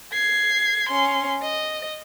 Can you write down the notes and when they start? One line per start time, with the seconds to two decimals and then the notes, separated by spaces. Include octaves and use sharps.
0.13 G#6 C7
0.89 C#4 C6
1.42 D#5